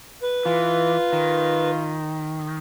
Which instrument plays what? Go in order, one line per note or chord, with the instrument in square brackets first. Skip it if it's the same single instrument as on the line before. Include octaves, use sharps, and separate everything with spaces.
[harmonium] B4
[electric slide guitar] E3 [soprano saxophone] F4
[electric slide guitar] D#3